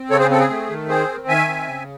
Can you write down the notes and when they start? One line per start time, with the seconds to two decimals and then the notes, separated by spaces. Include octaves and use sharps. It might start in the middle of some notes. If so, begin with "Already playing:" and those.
Already playing: C4
0.10 C#3 A4 C#5
0.20 G#4 C5
0.30 C4 A4
0.40 G#4
0.50 A3
0.69 D#3
0.89 C4 G#4 C5
1.09 D#3
1.28 D#3 E5 G#5
1.48 C4
1.68 C#3